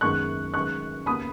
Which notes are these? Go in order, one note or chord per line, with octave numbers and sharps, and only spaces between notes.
F#1 F#2 D#3 G#3 B3 C#6 F#6
F#2 D#3 G#3 C#6 F#6
D#2 C#3 B3 B5 D#6